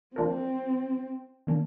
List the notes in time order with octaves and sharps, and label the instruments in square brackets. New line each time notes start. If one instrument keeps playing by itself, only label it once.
[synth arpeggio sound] F3 A#3 D4 F4 A#4 [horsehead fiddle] C4
[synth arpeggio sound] D#3 A#3 D4